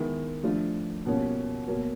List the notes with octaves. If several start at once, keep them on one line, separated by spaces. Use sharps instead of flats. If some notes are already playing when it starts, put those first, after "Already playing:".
Already playing: D#3 G#3 B3 E4
F3 A3 D4 F4
B2 G3 A#3 C#4 F4
B2 F#3 A#3